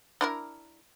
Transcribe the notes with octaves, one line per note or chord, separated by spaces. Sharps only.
D4 E4 A#4